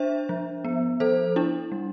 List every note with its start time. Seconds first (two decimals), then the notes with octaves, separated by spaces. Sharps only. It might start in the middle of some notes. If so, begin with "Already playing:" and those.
Already playing: D4 C5 E5
0.29 F3
0.65 B3
1.00 F3 A4 C5
1.36 D4 E4
1.72 G3